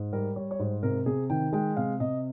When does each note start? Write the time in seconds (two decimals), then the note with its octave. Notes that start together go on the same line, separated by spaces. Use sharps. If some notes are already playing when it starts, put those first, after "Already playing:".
Already playing: G#2
0.13 G3 A#4
0.36 G3 C#5
0.51 C#5
0.59 G#2 C5
0.83 C3 A#4
1.06 C3 G#4
1.30 D#3 G5
1.53 G#3 G5
1.77 C3 F5
2.00 C3 D#5